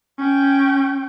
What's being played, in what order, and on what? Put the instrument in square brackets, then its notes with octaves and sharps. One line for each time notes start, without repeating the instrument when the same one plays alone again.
[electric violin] C#4 G5